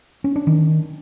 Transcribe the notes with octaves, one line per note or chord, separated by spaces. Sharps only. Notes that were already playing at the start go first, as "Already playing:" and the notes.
C#4
D4
D#3